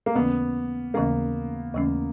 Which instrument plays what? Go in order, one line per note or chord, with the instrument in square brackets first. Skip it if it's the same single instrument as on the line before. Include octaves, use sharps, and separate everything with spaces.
[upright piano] A#3
[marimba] D#2 C#3 E3 A3 C#4 [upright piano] B3
[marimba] D#2 C#3 E3 A3 C#4 [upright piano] A#3
[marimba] D#2 C#3 E3 A3 C#4